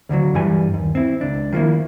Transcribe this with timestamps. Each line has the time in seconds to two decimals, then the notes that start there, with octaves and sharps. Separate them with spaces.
0.09 D2 D3 E3 F#3
0.35 G2 E3 G3 G#5
0.74 D#2
0.95 C4 E4
1.21 C#2 D4
1.52 D#3 F3 G3 A#3 E4